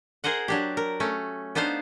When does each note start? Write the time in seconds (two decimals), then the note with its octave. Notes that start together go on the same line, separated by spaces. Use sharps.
0.24 G#4 A#4 C5 D#5 F#5
0.48 F#3 D4 G4
0.77 A#4
1.00 A3 C#4
1.55 B3 D4 D#4 C5 F5